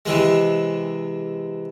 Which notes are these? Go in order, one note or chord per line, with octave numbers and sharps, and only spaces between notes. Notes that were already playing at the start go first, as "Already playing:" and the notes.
C3 E3 G#3